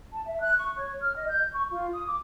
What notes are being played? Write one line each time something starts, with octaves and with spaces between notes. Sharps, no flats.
A5
E5
F#6
C#6
C#5
F6
D#5
G6
C#6
F4
D#6
D6